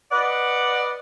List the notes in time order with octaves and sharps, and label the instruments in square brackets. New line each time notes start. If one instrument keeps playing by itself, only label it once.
[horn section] B4 D5 D#5 F#5